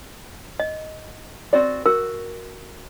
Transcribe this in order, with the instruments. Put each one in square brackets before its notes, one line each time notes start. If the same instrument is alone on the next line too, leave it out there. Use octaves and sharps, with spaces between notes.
[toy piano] D#5
[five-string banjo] C4 F#4 D5
[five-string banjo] F#4 [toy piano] A#4